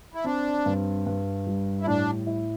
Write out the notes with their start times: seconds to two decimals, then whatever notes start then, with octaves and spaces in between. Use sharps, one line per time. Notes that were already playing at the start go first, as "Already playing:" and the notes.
0.14 E4
0.25 C4 D4
0.66 G2
1.06 G2
1.47 G3
1.81 E4
1.87 A2 D4
2.27 E4